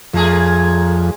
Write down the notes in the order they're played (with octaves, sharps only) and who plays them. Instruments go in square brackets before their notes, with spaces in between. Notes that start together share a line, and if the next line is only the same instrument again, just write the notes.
[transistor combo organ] F2 [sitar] A#2 A3 G#4